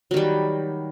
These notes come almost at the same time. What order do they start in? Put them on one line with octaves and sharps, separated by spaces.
F#3 D#3 G3